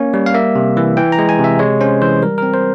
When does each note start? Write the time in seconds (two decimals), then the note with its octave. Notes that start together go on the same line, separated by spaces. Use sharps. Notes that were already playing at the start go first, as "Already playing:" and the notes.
Already playing: A#3 C#4 C#5
0.14 G3
0.26 F5
0.34 A#3 E5
0.56 C3
0.77 E3
0.97 E3 G5
1.12 A#5
1.19 G#3
1.29 G#5
1.39 C3
1.44 E5
1.59 G#3 C#5
1.81 C#4 C5
2.01 E3 C5
2.22 G3 A#4
2.38 C4 A#4
2.54 C5